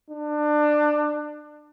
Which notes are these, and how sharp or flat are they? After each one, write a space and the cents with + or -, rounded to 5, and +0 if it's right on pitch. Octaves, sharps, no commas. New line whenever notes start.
D4 +25